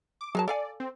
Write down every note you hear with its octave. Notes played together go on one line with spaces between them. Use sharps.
D6
F#3 G#4 A#4 A5
A4 D5 F5 G#5
C4